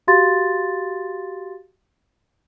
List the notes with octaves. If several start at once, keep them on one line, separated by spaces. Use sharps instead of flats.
F#4 G4 F5 C6 A6